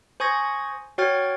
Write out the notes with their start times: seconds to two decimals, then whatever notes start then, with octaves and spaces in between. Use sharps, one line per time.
0.20 C5 G#5 C#6 D#6 G#6 A#6
0.98 F#4 C#5 G5 F6 G#6 A6